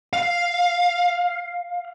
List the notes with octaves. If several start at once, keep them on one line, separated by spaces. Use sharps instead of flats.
F5